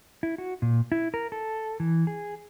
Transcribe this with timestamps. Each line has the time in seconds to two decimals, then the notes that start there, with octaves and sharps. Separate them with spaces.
0.23 E4
0.38 F#4
0.62 A#2
0.92 E4
1.14 A#4
1.32 A4
1.80 E3
2.07 G#4